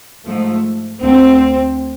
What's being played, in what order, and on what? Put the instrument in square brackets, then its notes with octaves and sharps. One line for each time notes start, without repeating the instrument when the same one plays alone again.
[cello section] G#2 F3 A3
D2 D3 A3 C4